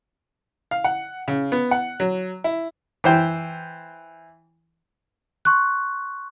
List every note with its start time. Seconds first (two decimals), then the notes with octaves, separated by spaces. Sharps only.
0.71 F5
0.84 F#5
1.28 C#3
1.52 B3
1.71 F#5
2.00 F#3
2.44 E4
3.04 E3 C5 G5
5.45 C6 C#6 F#6